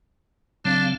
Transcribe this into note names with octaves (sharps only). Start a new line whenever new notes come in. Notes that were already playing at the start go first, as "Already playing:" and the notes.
C#3 F#3 C4 D4 F5